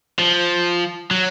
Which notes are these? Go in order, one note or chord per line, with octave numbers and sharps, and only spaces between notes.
F3
F#3